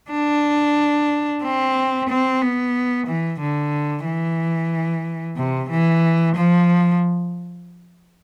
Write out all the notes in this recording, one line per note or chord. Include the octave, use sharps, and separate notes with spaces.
D4
C4
C4
B3
E3
D3
E3
C3
E3
F3